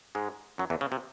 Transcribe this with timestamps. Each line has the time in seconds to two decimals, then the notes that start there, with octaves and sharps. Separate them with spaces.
0.15 G#2 G#3
0.58 F#2 F#3
0.70 E2 E3
0.81 C#3
0.92 C3